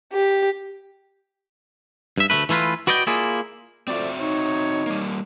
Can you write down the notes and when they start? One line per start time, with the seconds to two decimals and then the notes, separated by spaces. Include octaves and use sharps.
0.13 G4
2.18 G2 E5
2.30 D2 B2 A3 B4
2.49 E3 A3 E4 F4 B4
2.87 F#4 B4 D5 D#5 F#5 G5
3.07 A#3 E4 F4 G#4 D5
3.88 F3 A3 C4 F#4 D5 E5
4.20 D#4 C#5
4.86 G3 A#3